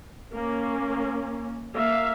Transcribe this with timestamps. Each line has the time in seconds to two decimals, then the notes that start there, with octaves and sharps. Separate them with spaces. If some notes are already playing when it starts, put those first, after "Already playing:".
0.35 A#3 C#4
1.75 A#3 E5 F5